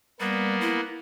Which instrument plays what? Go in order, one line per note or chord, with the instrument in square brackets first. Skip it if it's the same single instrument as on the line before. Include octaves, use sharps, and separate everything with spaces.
[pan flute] G3 [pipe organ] A#3 B3
[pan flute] E4